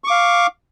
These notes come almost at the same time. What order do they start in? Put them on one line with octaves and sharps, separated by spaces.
C#6 D6 F5